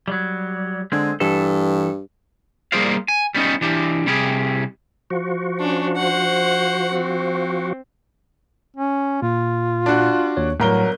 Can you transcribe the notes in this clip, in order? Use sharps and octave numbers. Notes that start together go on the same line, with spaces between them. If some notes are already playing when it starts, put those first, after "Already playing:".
F#3 G3
D3 G#3 C4
G2 E3 A4
G3 A#3 G#4 C5 D5 F5
G#5
G3 B3 C#4 D#4
E3 D4 G4
C3 G3 G4 G#4
F3 F#4
C#4 D4
C5 F#5
C4
C#4
A#2 F4
D4 F#4
D#2 C#5
G1 A2 F#3 A#4 G7